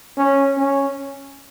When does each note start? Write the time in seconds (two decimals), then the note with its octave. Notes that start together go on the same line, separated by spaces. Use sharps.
0.17 C#4
0.57 C#4